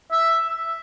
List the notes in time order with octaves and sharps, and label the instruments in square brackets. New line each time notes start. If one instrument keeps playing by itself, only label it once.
[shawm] E5